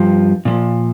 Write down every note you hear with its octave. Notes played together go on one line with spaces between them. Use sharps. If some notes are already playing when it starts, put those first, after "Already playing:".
Already playing: G2 F3
A#2 F3